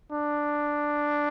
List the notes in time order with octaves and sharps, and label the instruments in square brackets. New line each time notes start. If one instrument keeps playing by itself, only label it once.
[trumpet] D4